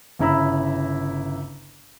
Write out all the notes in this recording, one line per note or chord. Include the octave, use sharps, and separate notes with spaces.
G1 C#3 E4 A#5 B5 E6